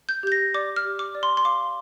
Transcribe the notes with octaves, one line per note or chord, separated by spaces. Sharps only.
G6
G4 G6
A#6
D5 D6
F6
G4
D6
D5
C6
C6
F5 D6